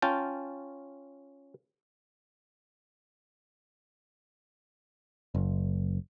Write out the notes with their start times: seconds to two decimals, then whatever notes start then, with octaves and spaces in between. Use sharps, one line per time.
0.02 C#4 F4 G5 A5
5.35 F#1